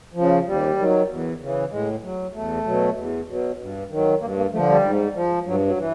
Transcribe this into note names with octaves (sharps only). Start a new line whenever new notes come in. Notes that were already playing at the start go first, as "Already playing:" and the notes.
C#3 F3
D#2 G3
D#3 F#3
E2
C#3 E3
A2 G#3
F#3
E2 A3
B2 F#3
E2
B2 F#3
G2
D#3 F#3
G2 A#3
A#3
D3 F3 A3
G3
G#2
F3
G2 F#3
F#3
E3